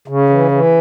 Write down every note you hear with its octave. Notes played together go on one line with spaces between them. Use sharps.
C#3
E3
E3